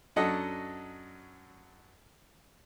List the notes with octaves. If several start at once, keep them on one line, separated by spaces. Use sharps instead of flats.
F#2 F#3 D4 A4 D#5 F#5